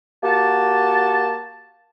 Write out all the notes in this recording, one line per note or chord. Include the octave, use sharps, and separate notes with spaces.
A#3 F#4 G4 A5